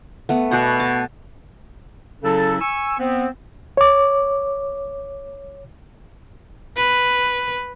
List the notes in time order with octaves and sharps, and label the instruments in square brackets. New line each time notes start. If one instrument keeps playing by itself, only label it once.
[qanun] A3 B3
[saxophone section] B2 [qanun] D5 F#5
[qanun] A5
[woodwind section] C#3 F#3 C#4 E4 A4
G#5 C#6 E6
B3 C4
[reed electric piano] C#5 D6
[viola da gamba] B4